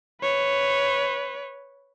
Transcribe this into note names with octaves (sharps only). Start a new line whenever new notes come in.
B4 C#5